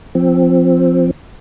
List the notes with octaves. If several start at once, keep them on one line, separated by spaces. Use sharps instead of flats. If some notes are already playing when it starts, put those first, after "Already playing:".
F3 C4